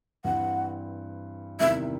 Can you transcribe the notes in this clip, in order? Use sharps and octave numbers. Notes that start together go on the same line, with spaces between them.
G2 E3 G3 C4 F#5
E2 C3 D#3 G3 E5